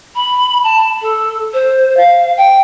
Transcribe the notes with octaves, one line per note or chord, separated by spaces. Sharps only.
B5
A5
A4
C5
F5
G5